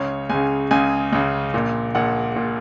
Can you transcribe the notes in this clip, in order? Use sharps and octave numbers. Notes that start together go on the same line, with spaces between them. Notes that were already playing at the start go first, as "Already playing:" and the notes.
Already playing: C#2 C#3 C#5
C#2 C#3 G#5
C#2 C#3 G#5
C#2 C#3
A#1 A#2
A#1 A#2 F#5
A#2